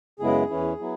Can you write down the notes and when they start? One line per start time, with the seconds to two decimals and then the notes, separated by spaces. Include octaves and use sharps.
0.20 F#2 C#3 G#3 B3 E4 G#4
0.49 E2 E3 C#4 E4
0.79 F#3 B3 E4